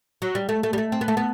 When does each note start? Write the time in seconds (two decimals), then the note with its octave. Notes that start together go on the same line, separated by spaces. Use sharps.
0.22 F#3
0.35 G3
0.49 A3
0.63 A3
0.73 G3
0.78 A3
0.92 C4
1.01 B3
1.08 A3
1.17 B3